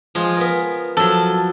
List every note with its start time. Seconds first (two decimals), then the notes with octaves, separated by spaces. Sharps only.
0.15 F3 G#3 F4
0.37 B3 A#4
0.97 F3 F#3 A4